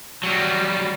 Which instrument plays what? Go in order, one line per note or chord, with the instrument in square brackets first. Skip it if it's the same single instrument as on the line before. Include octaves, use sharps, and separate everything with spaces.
[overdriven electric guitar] F#3 G3